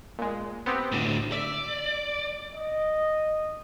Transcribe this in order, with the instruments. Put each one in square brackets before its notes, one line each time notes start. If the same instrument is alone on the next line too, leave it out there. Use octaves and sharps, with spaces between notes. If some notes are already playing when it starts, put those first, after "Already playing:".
[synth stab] A#2 G#3
B3 C4 G4
[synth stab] G1 [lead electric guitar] A2 D3
[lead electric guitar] D5 [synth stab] E5
[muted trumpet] D#5